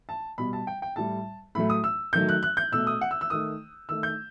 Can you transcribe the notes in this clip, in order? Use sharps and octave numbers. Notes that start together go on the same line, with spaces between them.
A5
B2 G3 B5
A5
G5
G5
A2 G3 A5
A2 F#3 A3 B5
D#6
E6
D#3 F#3 A3 G6
F#6
F#6
G6
B2 A3 E6
D#6
F#5
E6
E6
D#3 A3 D#6
D#3 A3 E6
G6